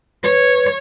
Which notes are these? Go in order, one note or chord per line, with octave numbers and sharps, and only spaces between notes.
B4 C#5